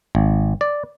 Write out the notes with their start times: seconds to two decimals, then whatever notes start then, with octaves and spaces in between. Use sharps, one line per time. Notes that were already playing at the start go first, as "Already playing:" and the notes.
0.15 G#1
0.61 D5